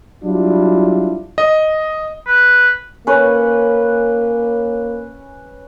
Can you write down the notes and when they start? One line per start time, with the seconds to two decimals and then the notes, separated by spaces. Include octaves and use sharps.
0.24 F#3 G3 D4 E4 F4
1.38 D#5
2.27 B4
3.07 A#3 C#4 B4